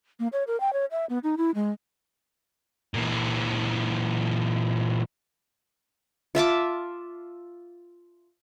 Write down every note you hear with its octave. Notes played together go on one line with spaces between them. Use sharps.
A#3
C#5
A#4
G5
C#5
E5
B3
D#4
E4
G#3
A#2 E3
F4 E5 A5 D6